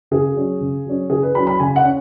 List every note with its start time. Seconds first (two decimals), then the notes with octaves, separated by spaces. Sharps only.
0.11 C#3 G#4
0.35 F#3 C#4
0.61 C#3
0.85 F#3 C#4
1.10 C#3 G#4
1.23 B4
1.35 F#3 C#4 B5
1.47 B5
1.60 C#3 G#5
1.76 F#5
1.84 C#4